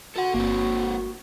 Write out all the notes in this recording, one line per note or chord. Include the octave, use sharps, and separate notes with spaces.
F#4 A4 F#5
G1 A#3 C4